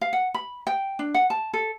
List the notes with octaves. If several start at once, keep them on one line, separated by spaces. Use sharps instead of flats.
F5
F#5
B5
G5
D4
F#5
A5
A4